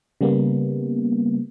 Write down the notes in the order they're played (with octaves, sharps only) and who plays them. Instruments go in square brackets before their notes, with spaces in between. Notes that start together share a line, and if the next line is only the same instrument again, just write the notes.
[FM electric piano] C#3 G3 A#3 B3